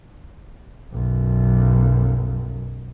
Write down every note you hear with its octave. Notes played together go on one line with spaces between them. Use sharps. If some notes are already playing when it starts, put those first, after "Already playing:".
B1 F#2